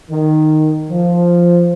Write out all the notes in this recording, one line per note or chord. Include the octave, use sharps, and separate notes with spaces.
D#3
F3